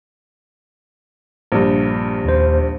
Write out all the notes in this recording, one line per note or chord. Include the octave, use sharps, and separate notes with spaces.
A#1 G2
D#2 C5